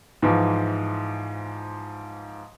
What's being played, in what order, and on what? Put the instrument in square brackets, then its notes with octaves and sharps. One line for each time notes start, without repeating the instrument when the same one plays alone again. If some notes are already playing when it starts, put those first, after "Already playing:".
[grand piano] G#2 E3 F3